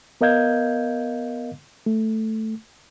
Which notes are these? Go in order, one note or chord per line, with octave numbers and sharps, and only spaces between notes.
B3 A#4 D#5 F5 G6 G#6
A3